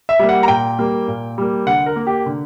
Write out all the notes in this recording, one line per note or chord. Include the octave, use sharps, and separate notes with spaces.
E5
G3 A#3
F#5
A#5
A#2 G5
G3 A#3
A#2
G3 A#3
D3 F#5
A#4
A#3
G4
D3